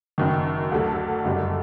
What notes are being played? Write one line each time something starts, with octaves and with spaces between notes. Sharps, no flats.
F#1 F#2 D#3
D2 D3 F#3 A4
F#1 F#2 D3 G3